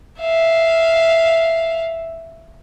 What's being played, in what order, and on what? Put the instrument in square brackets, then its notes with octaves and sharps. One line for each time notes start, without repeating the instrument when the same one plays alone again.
[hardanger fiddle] E5 F5